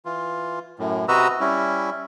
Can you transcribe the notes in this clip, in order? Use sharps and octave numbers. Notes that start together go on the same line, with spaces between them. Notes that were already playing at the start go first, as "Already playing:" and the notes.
E3 F4
F#2 A2
C3 F#4 B4 D#5 A#5 E6
G3 C#4 E4